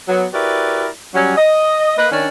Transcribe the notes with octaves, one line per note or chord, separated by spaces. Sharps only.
F#3 B3
E4 F#4 G4 A#4 B4 D5
F#3 G3 C#4
D#5
A#3 B4 D#5
D#3 C#4 D4